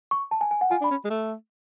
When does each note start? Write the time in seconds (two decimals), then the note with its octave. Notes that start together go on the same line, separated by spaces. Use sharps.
0.11 C#6
0.31 A5
0.41 G#5
0.51 G#5
0.61 F#5
0.71 F4 G#5
0.81 D4
0.84 B5
0.91 C#4
1.05 G#3
1.10 A3